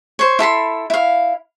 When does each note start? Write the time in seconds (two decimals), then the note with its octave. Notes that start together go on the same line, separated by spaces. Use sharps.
0.19 C5 C#5
0.39 E4 A4 B5 C6
0.90 E4 F5